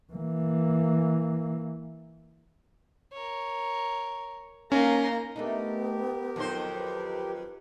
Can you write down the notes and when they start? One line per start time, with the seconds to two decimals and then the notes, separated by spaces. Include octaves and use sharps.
0.13 E3 A#3
3.13 A#4 C#5
4.72 A#3 C#4 D#4 A#5 C6
5.36 A3 B3 D4 D#4 G4 A#4
6.36 F2 D#3 F#3 D#4 C5
6.77 B4